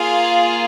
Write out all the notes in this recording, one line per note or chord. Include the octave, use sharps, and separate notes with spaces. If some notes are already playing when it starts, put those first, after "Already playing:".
Already playing: A#3 F4 G#4 F5